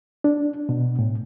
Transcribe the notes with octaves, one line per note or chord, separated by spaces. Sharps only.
D4
B2
A2